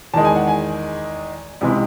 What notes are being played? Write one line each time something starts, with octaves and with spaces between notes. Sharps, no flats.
E2 D#3 G#3 A5
G#5
F#5
G#5
C#2 C3 E3 G#3